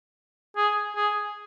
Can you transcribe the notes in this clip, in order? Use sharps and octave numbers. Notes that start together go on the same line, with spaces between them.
G#4
G#4